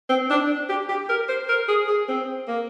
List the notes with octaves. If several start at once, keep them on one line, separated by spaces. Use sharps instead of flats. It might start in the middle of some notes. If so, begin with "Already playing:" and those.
C4
D4
G4
G4
A#4
C5
A#4
G#4
G#4
C4
A#3